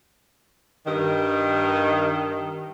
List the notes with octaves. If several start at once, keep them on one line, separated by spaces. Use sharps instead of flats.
G2 D#3